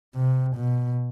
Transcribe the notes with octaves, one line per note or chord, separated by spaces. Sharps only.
C3
B2